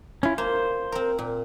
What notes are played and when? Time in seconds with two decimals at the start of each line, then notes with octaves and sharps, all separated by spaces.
0.23 C#4 E4 F4
0.38 A#3 C5
0.92 C4 A#4
1.19 A#2